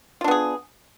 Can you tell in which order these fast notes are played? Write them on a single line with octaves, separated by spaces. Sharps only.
F4 D4 B3 G#4